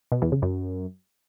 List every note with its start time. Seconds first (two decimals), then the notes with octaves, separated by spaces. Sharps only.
0.12 B2
0.22 E2
0.32 C#3
0.42 F#2